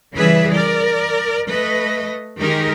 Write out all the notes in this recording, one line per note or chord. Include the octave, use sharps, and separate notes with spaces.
C#3 E3 G3 G#4 B4 E5
A#4 D5
A3 B4 D#5
D#3 G#3 D#4 G4 G#4 A#4